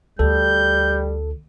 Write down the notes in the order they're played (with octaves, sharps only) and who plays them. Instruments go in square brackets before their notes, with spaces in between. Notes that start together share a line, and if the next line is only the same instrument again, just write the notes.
[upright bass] D2 [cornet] G3 [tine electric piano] A4 [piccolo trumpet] G6